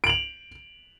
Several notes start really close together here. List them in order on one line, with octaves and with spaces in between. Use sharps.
D7 F#7 F7